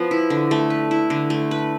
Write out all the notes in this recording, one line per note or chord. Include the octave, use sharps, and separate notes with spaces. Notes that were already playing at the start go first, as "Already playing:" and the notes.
Already playing: F3 B3
E4
D3
A3
B4
E4
D3
A3
B4